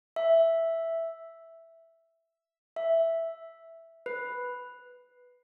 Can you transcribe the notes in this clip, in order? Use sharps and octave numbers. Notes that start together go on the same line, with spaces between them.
E5
E5
B4